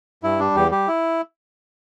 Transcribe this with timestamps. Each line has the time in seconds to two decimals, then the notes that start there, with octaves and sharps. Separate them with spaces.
0.23 G2 E4
0.39 G3 D4
0.55 E2 G4
0.71 G3 G4
0.88 E4